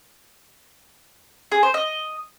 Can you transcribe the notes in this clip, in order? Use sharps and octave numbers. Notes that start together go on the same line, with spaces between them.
G#4
C5
D#5